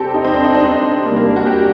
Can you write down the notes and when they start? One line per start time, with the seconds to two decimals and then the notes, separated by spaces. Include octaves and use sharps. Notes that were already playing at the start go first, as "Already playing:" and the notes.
Already playing: C3 G3 C4 G4 A4
0.14 D#4
0.24 C4
0.34 D4
0.44 D#4
0.55 D4
0.65 C4
1.06 C3 G3 A#3
1.16 A#3
1.26 D4
1.36 F#4
1.46 G4